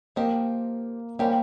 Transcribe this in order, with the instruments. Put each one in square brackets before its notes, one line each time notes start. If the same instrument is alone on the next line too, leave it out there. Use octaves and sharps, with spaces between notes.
[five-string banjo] F3 C4 G4 A#4 D#5 [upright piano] A#3
[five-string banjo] D#3 G3 C#4 G4 C5 [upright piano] A#3